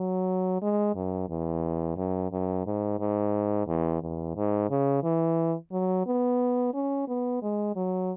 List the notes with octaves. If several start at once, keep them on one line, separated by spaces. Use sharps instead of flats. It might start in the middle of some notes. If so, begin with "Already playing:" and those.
Already playing: F#3
G#3
F#2
E2
F#2
F#2
G#2
G#2
E2
E2
G#2
C#3
E3
F#3
B3
C#4
B3
G#3
F#3